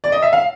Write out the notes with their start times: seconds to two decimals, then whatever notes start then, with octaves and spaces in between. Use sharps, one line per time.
0.04 D5
0.12 D#5
0.22 E5
0.33 F5